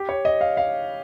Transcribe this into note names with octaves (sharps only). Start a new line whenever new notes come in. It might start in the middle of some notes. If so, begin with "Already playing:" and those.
Already playing: G4
C#5
D#5
F5
F5